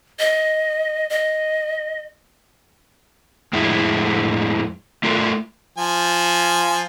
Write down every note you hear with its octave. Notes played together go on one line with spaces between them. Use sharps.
D#5
D#5
F2 A2 G#3 E4
A3 F4 A4 A#4
F3 G#5